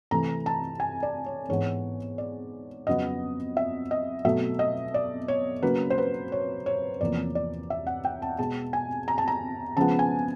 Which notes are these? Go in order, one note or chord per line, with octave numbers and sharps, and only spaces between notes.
C3 E3 A3 A#5
A5
G#5
D5
C#5
G#2 E3 G#3 B3 C#5
D5
F2 C#3 F#3 B3 D#5
E5
D#5
B2 F#3 A3 E5
D#5
D5
C#5
C#3 F#3 A#3 B4
C5
B4
C#5
C#5
E2 C3 F3 A#3 D5
D5
E5
F#5
G5
A5
B2 G#3 B3 A5
G#5
A#5
A5
A#5
C#3 F3 G#3 B3 A5
G#5